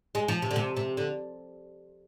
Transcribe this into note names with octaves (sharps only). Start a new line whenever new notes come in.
G#3
F3
C3
D3
C3
C3
D3